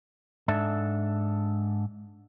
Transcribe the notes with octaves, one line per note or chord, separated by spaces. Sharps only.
G#2 D4 A4 E5